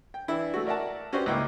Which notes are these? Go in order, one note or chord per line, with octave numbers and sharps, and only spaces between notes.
G5
E3 D4 E4
A3 F#4
A#4 D5 E5 F#5 A5
C#4 F#4 G4 B4 C5 D5
C#2 A#3 E4 D#5 G5 D6